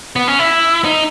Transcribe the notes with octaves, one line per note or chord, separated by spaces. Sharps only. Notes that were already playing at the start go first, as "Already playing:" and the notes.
B3
C#4
E4
D#4